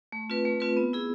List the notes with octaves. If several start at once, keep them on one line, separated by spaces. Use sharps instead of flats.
A3
C4 F4 B4
A3
C4 F4 B4
B3
E4 G#4